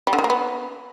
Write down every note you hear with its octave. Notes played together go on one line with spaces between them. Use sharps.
G3
D3
D#3
A#3
B3